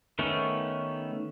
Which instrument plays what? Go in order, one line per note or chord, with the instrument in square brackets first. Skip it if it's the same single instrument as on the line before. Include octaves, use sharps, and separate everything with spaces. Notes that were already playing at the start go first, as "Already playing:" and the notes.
[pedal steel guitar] D#3 A3 B3 C#4